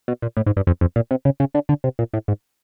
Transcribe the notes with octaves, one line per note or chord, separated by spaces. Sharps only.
B2
A#2
A2
G#2
G2
F2
F2
A#2
C3
C#3
C#3
D3
D3
C3
A#2
A2
G#2